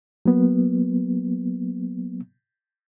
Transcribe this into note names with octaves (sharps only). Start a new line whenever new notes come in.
F#3 A#3 B3